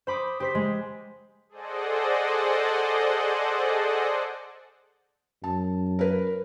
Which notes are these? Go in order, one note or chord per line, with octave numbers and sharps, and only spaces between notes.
C5 B5 D6 D#6
G4 C5 B6
G#3
G#4 A4 C5 D5 D#5 F#5
F#2 A5
A#4 B4